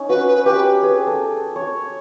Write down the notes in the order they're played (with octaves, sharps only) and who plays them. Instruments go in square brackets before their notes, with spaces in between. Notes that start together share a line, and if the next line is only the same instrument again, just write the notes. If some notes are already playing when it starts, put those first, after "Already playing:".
Already playing: [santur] C#4 D#4
[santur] F#4 [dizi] B4
[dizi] B4
[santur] G4 [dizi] B4
[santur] G#4
A4
C#5